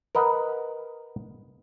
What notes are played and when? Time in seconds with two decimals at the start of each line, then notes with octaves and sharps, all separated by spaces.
0.15 A#4 B4 D#5 F#5